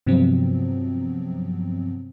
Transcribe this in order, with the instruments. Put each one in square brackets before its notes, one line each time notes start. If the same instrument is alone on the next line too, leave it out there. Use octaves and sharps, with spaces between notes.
[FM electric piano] G2 C3 F3 F#3 B3 C4